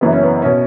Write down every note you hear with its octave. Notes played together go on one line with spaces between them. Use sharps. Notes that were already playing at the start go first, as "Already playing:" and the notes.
F#1 F#2 E3 B3
C#4
B3
B2 C#4